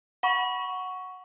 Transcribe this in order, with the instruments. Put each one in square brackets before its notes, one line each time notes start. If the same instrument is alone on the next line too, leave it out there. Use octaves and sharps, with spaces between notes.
[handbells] F#5 B5 C#6